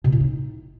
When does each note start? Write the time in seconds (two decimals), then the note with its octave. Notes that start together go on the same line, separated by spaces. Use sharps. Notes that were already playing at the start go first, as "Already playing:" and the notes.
0.04 B2
0.12 A2
0.20 D#4